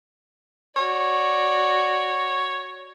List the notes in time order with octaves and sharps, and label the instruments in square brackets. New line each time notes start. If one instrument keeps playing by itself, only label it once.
[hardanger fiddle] F#4 D5 [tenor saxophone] C#5